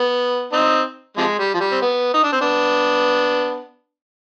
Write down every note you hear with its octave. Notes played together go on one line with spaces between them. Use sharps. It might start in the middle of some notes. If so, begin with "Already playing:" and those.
Already playing: B3
C4 D#4
C3 F3 G#3
G3
F3
G3
C4
B3
D#4
D4
C4
B3 D4